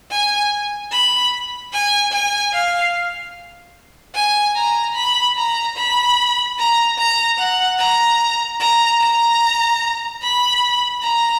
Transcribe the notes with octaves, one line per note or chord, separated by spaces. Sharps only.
G#5
B5
G#5
G#5
F5
G#5
A#5
B5
A#5
B5
A#5
A#5
F#5
A#5
A#5
A#5
B5
A#5